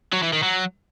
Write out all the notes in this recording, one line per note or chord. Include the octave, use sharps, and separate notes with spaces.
F#3
E3
D#3
F#3